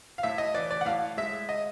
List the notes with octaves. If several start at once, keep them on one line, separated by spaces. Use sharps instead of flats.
F5
A2 E5
D#5
E3 D5
D5
F#5
A2 F5
G#3 E5
D#5